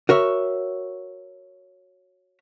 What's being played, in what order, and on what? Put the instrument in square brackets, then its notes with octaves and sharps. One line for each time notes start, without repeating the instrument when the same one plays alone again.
[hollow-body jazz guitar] F#4 A#4 C#5 E5